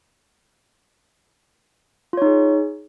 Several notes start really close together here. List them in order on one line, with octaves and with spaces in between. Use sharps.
F4 C#5 D#4 G#4